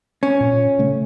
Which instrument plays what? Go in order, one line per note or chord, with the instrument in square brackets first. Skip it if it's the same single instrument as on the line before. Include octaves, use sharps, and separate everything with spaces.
[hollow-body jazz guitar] C#4
[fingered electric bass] A#2
C#3 A3